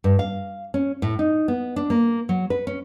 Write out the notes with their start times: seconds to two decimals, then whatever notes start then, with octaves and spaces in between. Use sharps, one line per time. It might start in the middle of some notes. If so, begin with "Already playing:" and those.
0.04 G2
0.19 F5
0.74 C#4
1.02 A2
1.19 D#4
1.48 B3
1.76 D4
1.90 A#3
2.29 F#3
2.50 B4
2.67 C#4